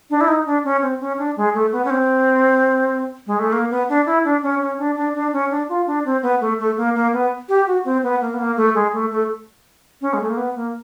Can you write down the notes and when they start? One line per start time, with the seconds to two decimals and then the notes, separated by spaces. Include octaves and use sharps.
0.10 D4
0.21 E4
0.28 D#4
0.46 D4
0.64 C#4
0.82 C4
1.00 C#4
1.18 D4
1.37 G#3
1.54 A3
1.72 B3
1.85 C#4
1.90 C4
3.27 G#3
3.39 A3
3.52 A#3
3.70 B3
3.89 D4
4.06 E4
4.24 D4
4.42 C#4
4.61 C#4
4.79 D4
4.96 D4
5.15 D4
5.33 C#4
5.51 D4
5.69 F4
5.87 D4
6.05 C4
6.23 B3
6.41 A3
6.59 A3
6.77 A#3
6.95 A#3
7.13 B3
7.49 G4
7.67 F#4
7.85 C4
8.03 B3
8.21 A#3
8.34 B3
8.39 A#3
8.57 A3
8.75 G#3
8.93 A3
9.11 A3
10.01 C#4
10.13 G#3
10.21 A3
10.29 A#3
10.37 B3
10.55 A#3